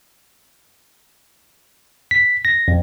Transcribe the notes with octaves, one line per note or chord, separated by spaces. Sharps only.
B6
A#6
F2